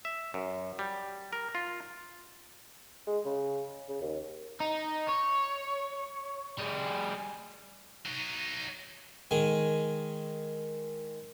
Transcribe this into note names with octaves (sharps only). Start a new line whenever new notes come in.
E5
F#2
G3
A#4
F4
G#3
C#3
C#3
D#2
D#4
C#5
G3 G#4
F#3 D#4
D#3 G#3 G#5